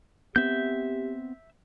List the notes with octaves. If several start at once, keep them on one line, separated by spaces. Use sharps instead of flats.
B3 C4 G4 E5 G6